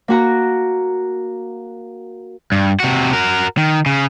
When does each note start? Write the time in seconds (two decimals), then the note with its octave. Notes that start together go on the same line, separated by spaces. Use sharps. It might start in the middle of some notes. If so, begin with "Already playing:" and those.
0.08 A#3 F#4 A#5
2.52 G2
2.80 C3 F#4
3.13 F#4 A#4
3.57 D#3
3.86 C#3